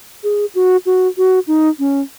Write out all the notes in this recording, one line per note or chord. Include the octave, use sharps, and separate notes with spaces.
G#4
F#4
F#4
F#4
D#4
C#4